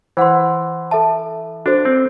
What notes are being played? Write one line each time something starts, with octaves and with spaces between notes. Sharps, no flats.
E3 C5 F#5 C6
A4 E5 A5
D4 F#4 A4 C5
C4